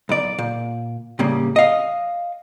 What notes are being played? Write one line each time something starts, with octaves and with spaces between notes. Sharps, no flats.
B1 D5
A#2
A2 C#3 G3 A#3
D#5 F5